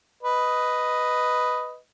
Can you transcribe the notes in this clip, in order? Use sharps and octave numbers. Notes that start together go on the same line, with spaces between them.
B4 D#5